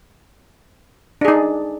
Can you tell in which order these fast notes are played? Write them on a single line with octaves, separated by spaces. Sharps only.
D4 G#4 D#4